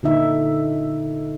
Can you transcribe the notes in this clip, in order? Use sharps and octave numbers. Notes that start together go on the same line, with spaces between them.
A#2 D3 D#4 E5